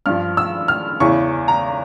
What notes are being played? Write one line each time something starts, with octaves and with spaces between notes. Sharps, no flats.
G2 F3 F6
E6
F6
E2 C#3 E3 C#6
A#5